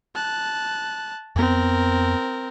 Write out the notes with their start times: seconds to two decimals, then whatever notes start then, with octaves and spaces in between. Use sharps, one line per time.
0.15 A5 F#6
1.36 F2 B3 C4 A#4